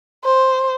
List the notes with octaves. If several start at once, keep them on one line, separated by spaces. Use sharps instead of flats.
C5